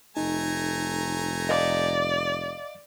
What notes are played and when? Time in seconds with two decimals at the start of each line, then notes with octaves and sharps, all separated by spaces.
0.17 F1 A3 D#4 G#5 A#5
1.49 D5 D#5 F5